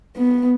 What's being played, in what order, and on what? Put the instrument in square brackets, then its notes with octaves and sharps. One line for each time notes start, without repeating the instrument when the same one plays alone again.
[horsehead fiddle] B3